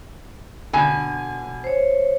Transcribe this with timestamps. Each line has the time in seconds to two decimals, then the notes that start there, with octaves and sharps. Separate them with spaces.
0.73 B2 D3 G#5
1.64 C5 C#5